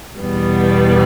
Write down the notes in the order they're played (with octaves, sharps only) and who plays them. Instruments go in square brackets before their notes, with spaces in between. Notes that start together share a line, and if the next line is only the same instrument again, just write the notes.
[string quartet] E2 B2 G3 B3